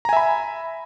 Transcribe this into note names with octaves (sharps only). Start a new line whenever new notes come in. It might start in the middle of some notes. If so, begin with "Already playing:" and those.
E5 G#5 A#5 B5